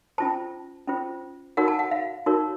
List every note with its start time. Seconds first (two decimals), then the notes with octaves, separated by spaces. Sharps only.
0.18 C#4 F4 C5 A5
0.88 C#4 F4 C5
1.57 D#4 F#4 A#4 C#5 F#5
1.68 A5
1.79 F#5
1.91 F5
2.26 D#4 F#4 A#4 C#5